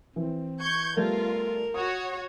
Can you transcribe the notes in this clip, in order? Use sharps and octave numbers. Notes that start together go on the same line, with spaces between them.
E3 C4
C#6 G6 G#6
G3 A3 B3 F4 A#4
F#4 C#5 D#6